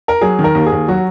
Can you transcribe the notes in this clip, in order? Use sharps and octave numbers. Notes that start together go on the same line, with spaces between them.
A#4
F#3 G#4
D#3
A#4
D#2
G#4
D#2
F#3 F#4